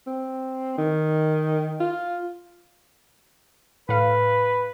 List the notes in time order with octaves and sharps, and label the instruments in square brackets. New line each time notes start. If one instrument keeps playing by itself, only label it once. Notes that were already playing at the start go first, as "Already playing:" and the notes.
[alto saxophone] C4
D#3
F4
[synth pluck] A2 F5 [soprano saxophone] B4